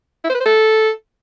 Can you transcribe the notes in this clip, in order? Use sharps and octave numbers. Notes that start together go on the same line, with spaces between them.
E4
C5
B4
C5
A4